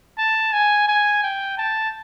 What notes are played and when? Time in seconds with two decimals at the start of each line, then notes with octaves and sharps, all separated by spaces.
0.18 A5
0.53 G#5
0.88 G#5
1.23 G5
1.58 A5